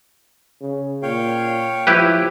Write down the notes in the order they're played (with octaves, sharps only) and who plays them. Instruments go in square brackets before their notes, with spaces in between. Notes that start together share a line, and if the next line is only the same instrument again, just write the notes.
[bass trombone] C#3
[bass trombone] A#2 [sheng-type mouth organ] C#5 F5 G5
[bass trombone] F3 [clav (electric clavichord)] E4 G4 B4